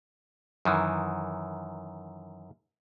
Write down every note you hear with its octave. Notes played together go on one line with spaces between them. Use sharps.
F#2 D#3 E3